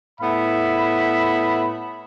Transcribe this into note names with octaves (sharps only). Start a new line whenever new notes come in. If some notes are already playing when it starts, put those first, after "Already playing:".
A2 B3 E5 B5